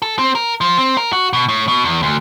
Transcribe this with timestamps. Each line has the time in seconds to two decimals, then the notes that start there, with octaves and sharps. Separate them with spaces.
0.02 A4
0.19 C4
0.35 A#4
0.61 F3
0.78 C4
0.97 A#4
1.13 F#4
1.33 B2
1.49 A2
1.68 B2
1.85 E2
2.03 D2